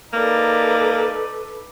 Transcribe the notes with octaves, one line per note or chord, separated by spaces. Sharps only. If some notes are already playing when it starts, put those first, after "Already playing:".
A#3 D#4 A4 B4 D5